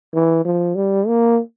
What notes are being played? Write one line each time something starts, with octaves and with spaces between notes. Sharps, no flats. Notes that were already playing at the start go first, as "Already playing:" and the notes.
E3
F3
G3
A#3